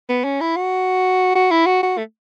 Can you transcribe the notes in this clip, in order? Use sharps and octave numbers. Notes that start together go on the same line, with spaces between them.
B3
C#4
E4
F#4
F#4
E4
F#4
F#4
A3